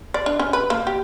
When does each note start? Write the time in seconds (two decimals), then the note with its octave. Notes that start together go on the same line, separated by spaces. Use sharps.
0.14 D5
0.26 D4
0.40 C#4
0.53 B4
0.70 A#3
0.87 G4